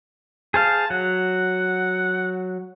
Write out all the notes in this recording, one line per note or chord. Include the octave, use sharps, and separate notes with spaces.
G#4 C5 F5 A5
F#3 F#5